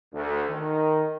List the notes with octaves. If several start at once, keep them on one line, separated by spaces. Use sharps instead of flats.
D2
D#3